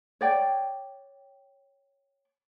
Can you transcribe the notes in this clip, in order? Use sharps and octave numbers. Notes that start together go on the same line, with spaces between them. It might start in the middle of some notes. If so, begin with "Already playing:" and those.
C#5 D5 G5